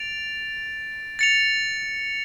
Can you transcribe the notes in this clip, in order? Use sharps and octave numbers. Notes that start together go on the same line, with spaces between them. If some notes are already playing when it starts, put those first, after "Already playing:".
Already playing: A6 D7 F7
A6 C#7 F7